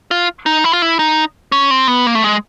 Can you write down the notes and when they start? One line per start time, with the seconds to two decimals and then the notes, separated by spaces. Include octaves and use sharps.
0.11 F4
0.46 D#4
0.64 E4
0.73 F4
0.82 E4
0.99 D#4
1.52 C#4
1.71 C4
1.87 B3
2.06 A#3
2.15 A3
2.24 G#3